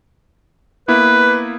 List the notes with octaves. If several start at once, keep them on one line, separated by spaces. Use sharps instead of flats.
A#3 B3 E4 B4